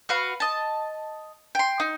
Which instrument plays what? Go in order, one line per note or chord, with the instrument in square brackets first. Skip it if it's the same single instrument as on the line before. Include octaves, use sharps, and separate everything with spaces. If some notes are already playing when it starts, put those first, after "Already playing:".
[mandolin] F#4 B4 F5
D#5 A5
G5 C6
D#4